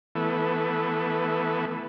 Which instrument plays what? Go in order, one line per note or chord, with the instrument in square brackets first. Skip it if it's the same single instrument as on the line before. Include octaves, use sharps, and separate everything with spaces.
[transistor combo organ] E3 A3 B3